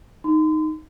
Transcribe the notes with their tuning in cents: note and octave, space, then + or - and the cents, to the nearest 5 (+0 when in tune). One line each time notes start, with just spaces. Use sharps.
D#4 +0 C6 -40